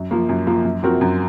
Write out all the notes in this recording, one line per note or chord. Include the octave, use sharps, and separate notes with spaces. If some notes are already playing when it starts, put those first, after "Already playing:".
Already playing: F#2
F3 A#3
F#2
F3 A#3
F#2
F3 C4 F#4 A#4
F#2